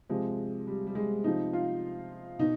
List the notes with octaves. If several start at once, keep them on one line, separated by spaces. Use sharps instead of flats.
C3 F3 G#3
G3
G3
G#3
C3 F3 D#4
F4
B2 D#4